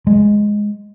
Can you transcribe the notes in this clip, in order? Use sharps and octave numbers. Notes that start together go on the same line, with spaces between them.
G#3